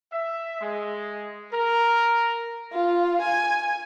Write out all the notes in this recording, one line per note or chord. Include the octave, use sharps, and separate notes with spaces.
E5
G#3
A#4
F4
G#5